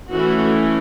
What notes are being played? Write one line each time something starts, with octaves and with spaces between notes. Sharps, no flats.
E3 A3 C#4 F#4